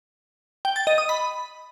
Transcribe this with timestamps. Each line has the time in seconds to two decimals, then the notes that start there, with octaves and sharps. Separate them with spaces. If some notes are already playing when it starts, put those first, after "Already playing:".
0.65 G5
0.76 A6
0.87 D#5
0.98 D#6
1.09 B5